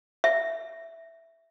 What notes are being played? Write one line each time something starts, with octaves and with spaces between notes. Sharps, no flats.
E5